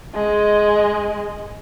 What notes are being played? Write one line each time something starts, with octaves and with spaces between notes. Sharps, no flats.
G#3 D#5